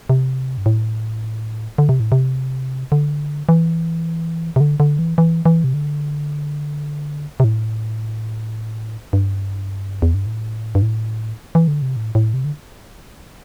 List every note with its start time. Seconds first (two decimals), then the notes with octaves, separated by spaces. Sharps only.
0.10 C3
0.57 G2
0.66 A2
1.78 D3
1.89 C3
2.00 A2
2.12 C3
2.92 D3
3.49 E3
4.56 C3
4.61 D3
4.80 D3
4.99 E3
5.18 E3
5.46 E3
5.64 C3
5.74 D3
7.40 C3
7.44 A2
9.13 G2
10.02 E2
10.14 G2
10.26 A2
10.75 G2
10.82 A2
11.55 E3
11.68 D3
11.82 C3
11.96 A2
12.15 A2
12.34 C3
12.44 D3